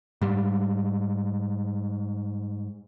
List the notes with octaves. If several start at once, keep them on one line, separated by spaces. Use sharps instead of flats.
G#2 G3